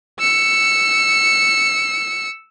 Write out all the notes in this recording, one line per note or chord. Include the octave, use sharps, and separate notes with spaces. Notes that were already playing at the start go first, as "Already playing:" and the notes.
E6 C#7